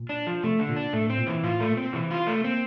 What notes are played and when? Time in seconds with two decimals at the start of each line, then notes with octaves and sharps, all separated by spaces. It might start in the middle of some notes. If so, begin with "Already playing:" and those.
Already playing: A#2
0.09 D4
0.27 F3
0.43 C3 A3
0.59 D3
0.68 A#2
0.76 D4
0.93 A2 A3
1.08 A2 C4
1.18 A#2
1.27 E3
1.43 A2 F4
1.60 A3
1.69 A#2
1.77 C4
1.93 C3 E3
2.11 F4
2.27 A3
2.44 A#3 C4